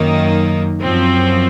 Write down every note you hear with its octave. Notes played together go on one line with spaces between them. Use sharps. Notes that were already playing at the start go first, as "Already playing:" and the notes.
Already playing: F#2 D#3 A#3 D#4
F#2 F3 C4